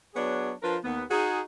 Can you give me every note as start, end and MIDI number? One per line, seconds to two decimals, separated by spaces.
0.14 0.51 54
0.14 0.51 59
0.14 0.51 62
0.14 0.51 68
0.14 0.51 73
0.62 0.76 53
0.62 0.76 62
0.62 0.76 65
0.62 0.76 70
0.62 0.76 71
0.84 1.02 39
0.84 1.02 59
1.10 1.40 63
1.10 1.40 66
1.10 1.40 68